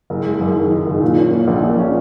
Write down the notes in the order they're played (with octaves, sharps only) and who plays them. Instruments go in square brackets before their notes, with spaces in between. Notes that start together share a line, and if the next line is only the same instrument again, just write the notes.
[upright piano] F#1
G#3
F#2
D#3
D#3
F#1
A#2
C#4
A#3
A#1
A#1
C#4